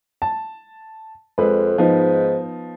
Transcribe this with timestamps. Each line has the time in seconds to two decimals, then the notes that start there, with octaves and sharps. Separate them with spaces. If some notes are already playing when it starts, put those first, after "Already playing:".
0.22 A5
1.38 F2 G#3 B4
1.78 G#2 F3 B3 D#4